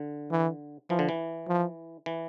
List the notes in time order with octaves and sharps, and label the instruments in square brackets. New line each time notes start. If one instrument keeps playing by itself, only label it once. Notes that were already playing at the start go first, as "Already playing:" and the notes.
Already playing: [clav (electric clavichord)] D3
[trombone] E3
[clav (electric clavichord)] E3 [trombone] F3
[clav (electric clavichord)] D3
E3
[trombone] F3
[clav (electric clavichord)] E3